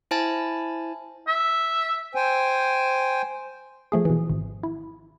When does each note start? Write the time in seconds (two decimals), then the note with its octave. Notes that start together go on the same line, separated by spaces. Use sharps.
0.11 E4 C5 G#5 A5 A6
1.28 E5
2.15 C5 G5 G#5
3.92 F3 A3 G#4
4.05 B2 E3
4.30 G#1
4.63 E4